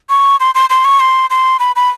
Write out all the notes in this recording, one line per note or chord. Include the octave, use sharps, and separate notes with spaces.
C#6
C6
C6
C6
C#6
C6
C6
B5
B5